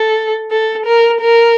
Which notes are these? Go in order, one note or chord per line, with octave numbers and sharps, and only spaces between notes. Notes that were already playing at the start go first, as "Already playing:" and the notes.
Already playing: A4
A4
A#4
A#4